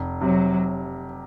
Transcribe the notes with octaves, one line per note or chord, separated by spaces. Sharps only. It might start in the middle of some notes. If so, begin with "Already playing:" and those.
Already playing: F1
C3 F#3